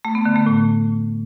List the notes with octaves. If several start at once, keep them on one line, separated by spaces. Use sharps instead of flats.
A3
B3
D3
A3
A2